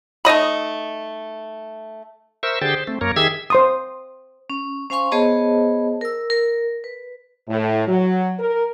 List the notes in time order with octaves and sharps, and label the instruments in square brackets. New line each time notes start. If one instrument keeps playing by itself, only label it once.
[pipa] A3 D#4 D#5 B5
[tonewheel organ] A#4 C5 E5 C#6 E6
D3 G4 G#4 C5 G5 A6
C5
A3 C4
F#2 A#3 A#4 C#5
D#3 G4 G#4 E5 E6 G#6
[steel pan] C5 C6 D#6
[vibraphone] C#4
C#4 C5 F5 G#5 C6 C#6
B3 G#4 C5 C#5 D#5 A5
A#4 E6
A#4
B4
[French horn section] A2
F#3
A#4